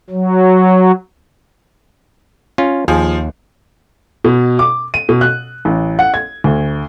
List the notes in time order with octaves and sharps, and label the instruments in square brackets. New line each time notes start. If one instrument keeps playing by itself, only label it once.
[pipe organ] F#3
[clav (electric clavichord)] C#4 F4
[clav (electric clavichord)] D#2 [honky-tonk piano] F3 G#4
[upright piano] B2
D6
D#7
B2
F#6
A1
F#5
G#6
D2